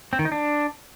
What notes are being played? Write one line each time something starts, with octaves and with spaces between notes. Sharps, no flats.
C4
D#3
D#4
D4